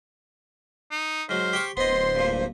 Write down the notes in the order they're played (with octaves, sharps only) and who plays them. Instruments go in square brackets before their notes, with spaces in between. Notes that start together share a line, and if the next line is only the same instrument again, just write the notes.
[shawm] D#4
[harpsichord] G#2 F#3 [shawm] C5 [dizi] F6
[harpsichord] G4 G5 C#6
[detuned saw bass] D1 [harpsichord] B3 D#5 [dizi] C5 [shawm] C6
[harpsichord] G2 A#2